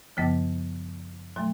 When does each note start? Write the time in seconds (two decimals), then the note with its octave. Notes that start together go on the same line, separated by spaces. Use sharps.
0.17 F#2 C#3 F3 B3
1.36 B2 F#3 A3